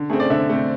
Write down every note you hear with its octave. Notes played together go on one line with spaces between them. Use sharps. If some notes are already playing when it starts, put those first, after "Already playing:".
Already playing: D3
A3 C4 G#4
D5
D3 E5
A3 C4